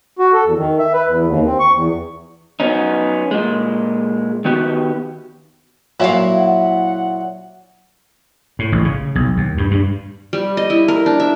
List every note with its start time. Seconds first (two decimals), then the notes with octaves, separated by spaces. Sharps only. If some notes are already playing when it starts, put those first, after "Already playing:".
0.19 F#4
0.33 A4
0.45 E2
0.58 D#3
0.79 E5
0.93 B4
1.07 E2
1.27 D#2
1.46 C4
1.60 C#6
1.73 E2
2.60 F#3 B3 C#4 D#4
3.31 A#2 G#3
4.45 D#3 B3 F#4 G4
6.00 A#2 F#3 E4 E5 F5
6.36 F#5
8.59 A2
8.72 A1
8.85 C#3
9.15 B1
9.37 D#2
9.58 G2
9.71 G2
10.33 G3
10.57 D#5
10.70 E4
10.88 A#4
11.06 D4
11.20 E5